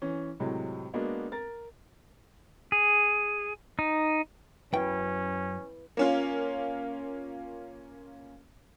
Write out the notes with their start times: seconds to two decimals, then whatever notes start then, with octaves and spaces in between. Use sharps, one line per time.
0.02 E3 C#4
0.40 A2 C3 F#3 G#3
0.94 G#3 A#3 B3 D4 F#4
1.32 A#4 A6
2.72 G#4
3.79 D#4
4.73 F#2 C#4 E4 B4 G5
5.97 A#3 C#4 F4